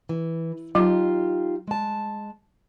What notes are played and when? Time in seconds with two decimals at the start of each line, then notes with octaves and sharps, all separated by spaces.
0.09 E3
0.75 F#3 D#4 F4 G4
1.67 G#3 A5